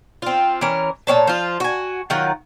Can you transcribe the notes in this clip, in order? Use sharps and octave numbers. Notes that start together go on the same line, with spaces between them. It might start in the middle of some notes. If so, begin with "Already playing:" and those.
C4 F4
E3 C#4 A#4
A#2 D4 C#5 A5
F3 F4
F#4 G#5
D#3 F#3 F4 F#5